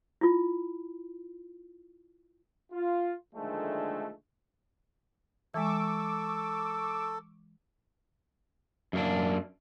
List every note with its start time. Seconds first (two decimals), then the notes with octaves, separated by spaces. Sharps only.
0.21 E4 F4
2.73 F4
3.36 A#2 D3 D#3 F3 G#3 A3
5.54 E3 G#3 A4 C#6 D6 E6
8.93 F#2 A#3 D4